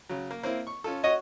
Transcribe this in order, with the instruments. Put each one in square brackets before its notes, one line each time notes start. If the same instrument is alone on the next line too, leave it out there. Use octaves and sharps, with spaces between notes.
[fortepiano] C#3 F#3
A#3
A#3 C4 E4
C#6
C#4 F4 A4
[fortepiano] F#4 C#5 C#6 [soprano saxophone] D#5